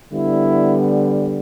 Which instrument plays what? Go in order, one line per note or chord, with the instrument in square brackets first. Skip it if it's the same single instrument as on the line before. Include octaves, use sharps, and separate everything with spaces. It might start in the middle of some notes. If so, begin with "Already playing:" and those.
[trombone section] D3 G3 B3 E4